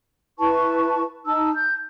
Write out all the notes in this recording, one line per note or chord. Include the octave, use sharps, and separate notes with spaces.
E4 B4 A5 C#6
D#4 A5 E6
G6